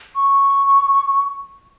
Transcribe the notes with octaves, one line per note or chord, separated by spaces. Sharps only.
C#6